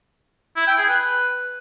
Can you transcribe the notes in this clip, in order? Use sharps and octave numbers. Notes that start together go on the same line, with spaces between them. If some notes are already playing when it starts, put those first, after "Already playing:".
E4
G5
G#4
B4